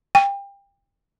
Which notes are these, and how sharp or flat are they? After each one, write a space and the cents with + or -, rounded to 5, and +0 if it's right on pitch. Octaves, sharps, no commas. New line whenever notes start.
G5 +30